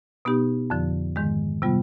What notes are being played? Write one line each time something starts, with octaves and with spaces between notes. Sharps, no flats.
B2 B3 D#4 G4
F2 D3 F3
G#2 D#3 G#3
C3 G3 B3 F4